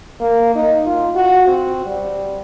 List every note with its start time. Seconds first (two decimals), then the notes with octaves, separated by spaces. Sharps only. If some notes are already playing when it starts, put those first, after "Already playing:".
0.20 A#3
0.55 D#4
0.86 F4
1.15 F#4
1.47 C4
1.86 G3